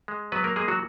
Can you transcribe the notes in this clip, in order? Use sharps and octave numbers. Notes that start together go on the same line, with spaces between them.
G#3
F#3 B3 B4
A#3 A#4
G#3 A#3 G#4
F#3 F#4